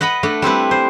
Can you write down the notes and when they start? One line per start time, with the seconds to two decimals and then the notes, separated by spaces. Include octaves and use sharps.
0.01 B4 D#5 F#5 B5
0.23 A3 D4
0.42 G3 C4 E4 B4
0.71 C5